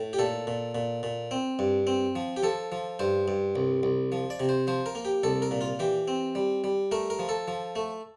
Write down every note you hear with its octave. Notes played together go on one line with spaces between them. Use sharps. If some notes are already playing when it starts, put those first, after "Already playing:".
Already playing: A2
G4
A#2 A4
A#2
A#2
A#2
C4
G2
C4
F3
G4
F3 A4
F3
G2 C5
G2
C2
C2
F3
D5
C3
C5
F3 C5
A#4
A#3
G4
C2 A4
A#4
A#2
F4
E3 G4
C4
G3
G3
A3 A#4
A#4
F3
A4
F3
A3